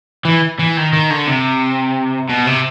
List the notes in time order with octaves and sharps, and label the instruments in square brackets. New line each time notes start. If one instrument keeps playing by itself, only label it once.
[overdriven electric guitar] E3
E3
D#3
D#3
D3
C3
B2
C3